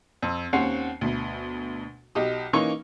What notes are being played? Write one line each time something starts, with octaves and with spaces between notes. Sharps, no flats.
F2
D#2 C4 C#4 C5 F#5 C7
D2 B2
B1 G4 D#5
E3 A#3 C#4 D#4 C#6